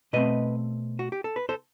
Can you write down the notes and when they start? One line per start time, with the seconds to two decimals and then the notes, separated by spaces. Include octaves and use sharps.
0.13 B2 A3 C4 B4 D#5
0.99 F#4
1.12 G4
1.24 A4
1.36 B4
1.49 A4 C5